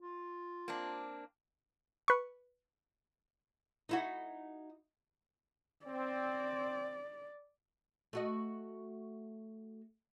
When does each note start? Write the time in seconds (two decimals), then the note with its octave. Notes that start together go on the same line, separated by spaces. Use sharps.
0.01 F4
0.68 A#3 C4 D4
2.08 B4 C#6
3.89 D#4 E4 F#4
5.86 C4 D5
8.13 A3 F#4 D#5